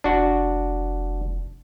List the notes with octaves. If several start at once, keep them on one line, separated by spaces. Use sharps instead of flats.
F1 D4 F#4